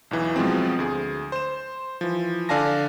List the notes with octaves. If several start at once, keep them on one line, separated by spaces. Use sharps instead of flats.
B1 E2 E3
B2 F3 F#3 G#3 C4
D2 G#4
C5 E7
E3 F3
D3 D5 F5 G#5 A5 A#6